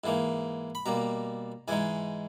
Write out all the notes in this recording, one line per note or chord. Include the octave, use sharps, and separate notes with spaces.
G#2 E3 A#3 D#4
B5
B2 G3 A#3 A#5
G#2 E3 G#3 D#4 G#5